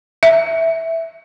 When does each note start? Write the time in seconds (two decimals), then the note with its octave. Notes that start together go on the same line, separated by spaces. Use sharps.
0.23 E5